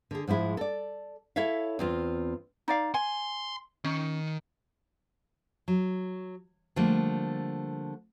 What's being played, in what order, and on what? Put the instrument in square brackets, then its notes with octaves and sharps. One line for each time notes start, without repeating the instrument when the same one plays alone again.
[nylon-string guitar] D3 G#4
G#2 F3 G#3 E4
A4 D5
E4 A4 C#5 E5 F5
E2 C4 F4
[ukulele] D#4 D5 F5
[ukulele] G#5 [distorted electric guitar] C6
[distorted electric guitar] D#3 [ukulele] C#4
[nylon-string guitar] F#3
D3 F3 G3 A3 A#3